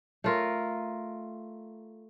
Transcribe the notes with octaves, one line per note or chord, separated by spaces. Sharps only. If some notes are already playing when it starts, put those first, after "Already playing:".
A3 F4 A#4